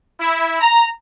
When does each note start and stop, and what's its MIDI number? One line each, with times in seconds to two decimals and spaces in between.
0.18 0.55 64
0.59 0.84 82